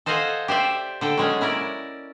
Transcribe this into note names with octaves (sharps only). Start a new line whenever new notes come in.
A4 C5 D#5 F5 F#5 G#5
G4 C5 D5 E5
D3 A4 G5
F#3 G#3 C#4
C#4 E4 A#4 D5